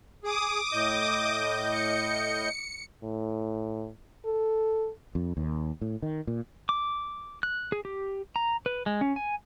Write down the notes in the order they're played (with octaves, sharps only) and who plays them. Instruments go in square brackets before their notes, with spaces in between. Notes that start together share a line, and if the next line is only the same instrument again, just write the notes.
[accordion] G#4 [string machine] D6 D#6
[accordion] A2 D#5 G6
[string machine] C#7
[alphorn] A2
A4
[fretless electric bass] F2
D#2
A2
D#3
A#2
[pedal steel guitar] D6
F#6
G#4
G4
A#5
B4
G#3
C#4
G#5